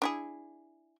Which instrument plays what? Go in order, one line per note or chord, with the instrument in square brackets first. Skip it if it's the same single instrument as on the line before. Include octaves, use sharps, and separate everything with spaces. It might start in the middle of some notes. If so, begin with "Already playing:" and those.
[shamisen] D4 E4 G#4